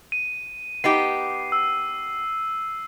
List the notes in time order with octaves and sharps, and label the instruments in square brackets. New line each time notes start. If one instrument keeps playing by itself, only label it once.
[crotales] D#7
[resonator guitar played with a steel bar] B3 D#4 G4 [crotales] C7
[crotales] E6